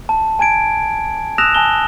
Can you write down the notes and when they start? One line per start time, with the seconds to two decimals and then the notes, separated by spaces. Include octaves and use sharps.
0.09 A5
0.39 G#5 A5 G#6 D7
1.38 D#6 E6 F#6 A#6 E7 F7
1.55 G#5 A5 G7